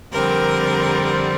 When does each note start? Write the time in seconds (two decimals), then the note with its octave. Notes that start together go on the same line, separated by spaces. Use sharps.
0.11 F2 D3 G3 C4 A#4
1.05 A#4